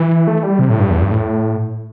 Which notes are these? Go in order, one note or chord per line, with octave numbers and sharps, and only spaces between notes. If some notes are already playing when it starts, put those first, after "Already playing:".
Already playing: E3
A3
G3
C3
A2
G2
E2
G2
A2